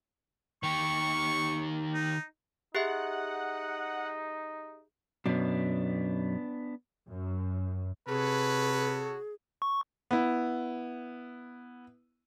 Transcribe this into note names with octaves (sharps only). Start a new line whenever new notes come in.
D#3 G4 C#6
D#4
D#4 G4 G#4 E5 F#5
F#2 B2 B3 D4
F#2
C3 F#4 G#4 A4 B4 C#5
C#6
B3 E4